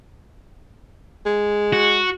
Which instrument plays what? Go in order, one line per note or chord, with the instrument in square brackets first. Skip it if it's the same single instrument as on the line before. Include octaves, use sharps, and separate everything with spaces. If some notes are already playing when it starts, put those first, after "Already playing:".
[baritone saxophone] G#3
[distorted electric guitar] F#4